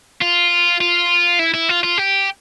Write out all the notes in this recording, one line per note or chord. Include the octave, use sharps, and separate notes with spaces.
F4
F4
E4
E4
F4
F4
G4